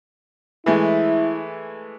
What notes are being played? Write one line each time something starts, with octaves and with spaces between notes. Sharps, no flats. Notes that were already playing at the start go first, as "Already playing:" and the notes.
E3 G#3 A3 E4